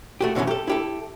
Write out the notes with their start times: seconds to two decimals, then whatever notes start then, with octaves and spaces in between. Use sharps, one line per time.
0.21 A3 F#4 G4
0.35 F#2 A2 C3 D#3 E3 C#4
0.47 G4 A4
0.67 E4 G4 A4